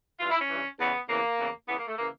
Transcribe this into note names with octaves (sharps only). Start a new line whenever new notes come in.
G2 E3 F4
E4
C#4
G2 E3
E2 C#3 E3 B3
E2 C#3 E3 A#3
E2 C#3 E3
E2 C#3 E3 B3
A#3
A3
C#3 E3 A#3